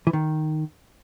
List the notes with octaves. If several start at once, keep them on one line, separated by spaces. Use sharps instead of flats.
E3
D#3